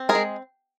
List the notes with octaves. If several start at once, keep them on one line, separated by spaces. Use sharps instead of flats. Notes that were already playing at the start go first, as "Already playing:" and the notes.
Already playing: C4
G#4 A#4
G#3